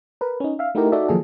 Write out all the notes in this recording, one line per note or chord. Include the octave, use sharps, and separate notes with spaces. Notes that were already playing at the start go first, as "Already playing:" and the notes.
A#4 B4
C#4 D#4
E5 F5
A3 D#4 E4 F#4 G4 A#4
D#4 F#4 A4 D5 E5
D#3 F3 F#3 A#3 G#4 A4